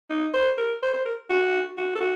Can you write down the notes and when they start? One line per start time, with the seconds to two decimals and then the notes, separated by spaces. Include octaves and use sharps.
0.10 D#4
0.34 C5
0.58 A#4
0.83 C5
0.94 C5
1.05 A#4
1.30 F#4
1.77 F#4
1.95 A4
2.00 F#4